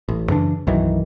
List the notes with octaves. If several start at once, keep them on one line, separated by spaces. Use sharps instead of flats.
A1
F#2 C#3 E3 D4
B1 F#2 D#3 E3